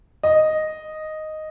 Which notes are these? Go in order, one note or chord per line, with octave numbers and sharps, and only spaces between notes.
D#5